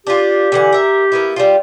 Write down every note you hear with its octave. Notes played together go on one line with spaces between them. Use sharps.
D4 F4 G4
D3 E3 F#5
A#4 E5
A#3 B3 E4
G3 D4 F4